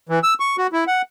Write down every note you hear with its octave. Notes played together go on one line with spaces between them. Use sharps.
E3
E6
C#6
F#4
E4
F#5